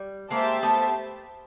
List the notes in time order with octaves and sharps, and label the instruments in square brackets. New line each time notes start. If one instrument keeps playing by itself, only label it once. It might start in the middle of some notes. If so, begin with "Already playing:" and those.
Already playing: [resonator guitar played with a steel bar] G3
[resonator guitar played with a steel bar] G#3 A#3 [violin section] G4 C5 E5 A5
[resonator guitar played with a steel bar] A3 B3